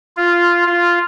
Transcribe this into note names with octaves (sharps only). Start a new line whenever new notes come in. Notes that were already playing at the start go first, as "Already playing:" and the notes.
F4
F4